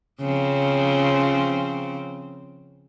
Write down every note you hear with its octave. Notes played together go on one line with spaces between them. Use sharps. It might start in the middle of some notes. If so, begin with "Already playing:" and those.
C#3 F3 C4